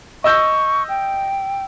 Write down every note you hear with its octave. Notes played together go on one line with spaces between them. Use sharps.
D#5 C#6 E6 G6
G5